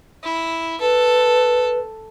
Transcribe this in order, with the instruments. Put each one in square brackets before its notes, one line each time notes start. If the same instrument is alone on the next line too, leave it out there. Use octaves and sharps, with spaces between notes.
[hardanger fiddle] E4
[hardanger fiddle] A4 [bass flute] B4